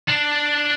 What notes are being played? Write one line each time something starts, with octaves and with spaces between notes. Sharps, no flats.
D4